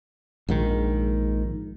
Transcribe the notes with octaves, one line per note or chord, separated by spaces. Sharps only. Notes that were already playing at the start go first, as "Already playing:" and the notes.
A#1 G#2 D#3